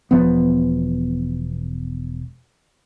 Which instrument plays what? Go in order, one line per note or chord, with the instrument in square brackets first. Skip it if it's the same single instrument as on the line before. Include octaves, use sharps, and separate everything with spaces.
[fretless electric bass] E1 F3 B3